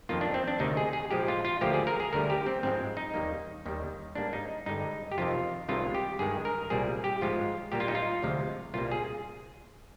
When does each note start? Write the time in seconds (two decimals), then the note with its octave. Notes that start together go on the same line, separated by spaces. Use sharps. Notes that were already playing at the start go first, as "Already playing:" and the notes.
0.09 F2 D#3 A#3 F4
0.21 D4
0.34 C4
0.47 D4
0.59 D2 C3 D#3 D#4
0.77 G#4
0.93 G#4
1.11 A#2 F3 G#3 G4
1.28 F4
1.45 F4
1.61 D2 D3 F3 A#3 G4
1.74 G#4
1.87 A#4
2.00 G#4
2.13 D2 D3 G3 A#4
2.30 G4
2.46 C4
2.63 G#2 F3 G#3 C4
2.97 D#4
3.14 D#2 D#3 G3 A#3
3.66 D#2 D#3 G3
4.15 G#2 G3 A#3 D4
4.33 D#4
4.66 G2 D3 G#3 D#4
5.12 G4
5.18 F2 C3 D#3 F4
5.69 C2 C3 D#3 G#3 F4
5.95 G4
6.19 G2 D#3 G#3 G#4
6.45 A#4
6.70 C2 A#2 G3 A#3 G#4
7.04 G4
7.21 G#2 F3 G#3 F4
7.72 A#2 G3 A#3 G4
7.80 F4
7.88 D#4
7.95 F4
8.23 D2 C3 F3 G#3
8.74 C2 A#2 G3 A#3 F4
8.91 G#4